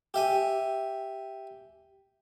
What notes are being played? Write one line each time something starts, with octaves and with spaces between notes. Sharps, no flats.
G4 E5 G#5